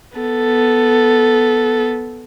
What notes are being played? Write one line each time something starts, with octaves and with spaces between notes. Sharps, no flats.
B3 A4